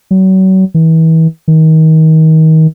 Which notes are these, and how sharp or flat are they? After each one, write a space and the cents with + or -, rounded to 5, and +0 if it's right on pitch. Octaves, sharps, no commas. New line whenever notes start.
F#3 +35
E3 -35
D#3 +30